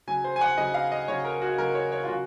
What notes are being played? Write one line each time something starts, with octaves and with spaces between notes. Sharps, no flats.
C#3 F#3 G#5
C5
G#5
F#5
C#3 F#3 D#5
F5
D#5
C#3 F#3 C#5
A#4
F#4
C#3 F#3 A#4
C#5
C#5
F4
C#3 F#3 F#4